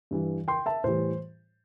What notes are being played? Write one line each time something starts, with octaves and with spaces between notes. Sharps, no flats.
G2 E3 G3
G5 C6
E5 A5
A2 E3 G3 C5